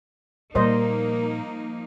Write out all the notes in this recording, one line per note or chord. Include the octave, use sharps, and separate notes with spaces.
A#2 F3 G3 A#3 D#4 A#4 C5 D#5